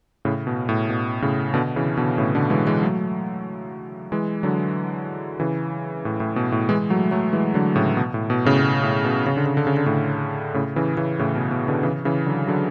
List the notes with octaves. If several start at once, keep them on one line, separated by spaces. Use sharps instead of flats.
A2 C#3
B2
A2
B2
A2 C#3
B2 D3
C#3 E3
B2 D3
A2 C#3
B2 D3
E3 G#3
E3 G#3
F#3 A3
E3 G#3
D3 F#3
C#3 E3
A2
A2
B2
A2
E3 G#3
F#3 A3
F#3 A3
E3 G#3
D3 F#3
A2 C#3
B2
A2
B2
A2 C#3
B2
A2
B2
C#3
D3
C#3
D3
C#3
D3
A2 C#3
A2 C#3
C#3 E3
C#3 E3
A2 C#3
B2
B2
B2 D3
C#3 E3
C#3 E3
D3 F#3
D3 F#3